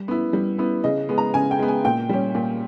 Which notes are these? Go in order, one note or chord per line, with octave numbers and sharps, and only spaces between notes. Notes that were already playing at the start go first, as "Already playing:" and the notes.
Already playing: G3
B3 E4
G3
B3 E4
C#3 D#5
G#3 B3
A#5
C#3 G#5
G5
G#3 B3
G#5
A#2 G5
G3 C#4
A#2